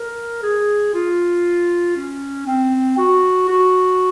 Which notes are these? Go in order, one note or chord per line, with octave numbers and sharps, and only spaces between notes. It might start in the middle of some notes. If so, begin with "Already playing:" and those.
Already playing: A#4
G#4
F4
C#4
C4
F#4
F#4